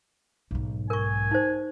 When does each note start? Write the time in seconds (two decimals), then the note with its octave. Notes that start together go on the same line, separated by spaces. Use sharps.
0.51 B1 G#2
0.90 A#4 G#5 C#6
1.31 D#4 C5